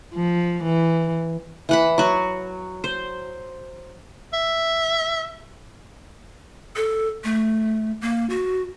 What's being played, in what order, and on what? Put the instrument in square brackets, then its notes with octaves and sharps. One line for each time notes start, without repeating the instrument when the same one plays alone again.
[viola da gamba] F3
E3
[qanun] E3 F#5 B5
F#3 F#4
C5
[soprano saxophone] E5
[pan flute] A4
A3
A#3
F#4